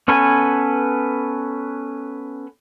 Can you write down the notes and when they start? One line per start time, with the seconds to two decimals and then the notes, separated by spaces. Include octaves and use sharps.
0.08 B3 C#4 A4 B4 G#5